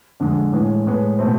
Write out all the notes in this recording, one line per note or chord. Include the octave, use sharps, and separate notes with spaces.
F2 D3 G#3
A2 E3 G#3
A2 G#3 B3
B2 A3 C4